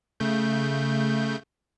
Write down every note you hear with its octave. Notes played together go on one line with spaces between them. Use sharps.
C#3 A3 G6